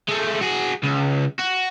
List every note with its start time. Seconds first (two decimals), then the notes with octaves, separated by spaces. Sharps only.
0.09 G#3 A3
0.41 F#4 G#4
0.83 C#2
1.39 F#4